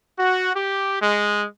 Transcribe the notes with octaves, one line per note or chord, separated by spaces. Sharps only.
F#4
G4
G#3